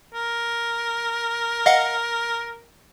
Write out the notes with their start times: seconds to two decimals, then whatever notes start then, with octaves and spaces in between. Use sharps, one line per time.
0.14 A#4
1.66 D#5 F5 F#5